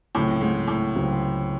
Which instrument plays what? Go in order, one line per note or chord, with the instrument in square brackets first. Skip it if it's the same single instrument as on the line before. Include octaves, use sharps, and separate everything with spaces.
[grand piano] C#2 C3 F#3 C4 [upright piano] A2
[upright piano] G#2
A2
[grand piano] C#2 C3 F#3 C4